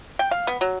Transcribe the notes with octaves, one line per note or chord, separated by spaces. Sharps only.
G5
F5
B3
F#3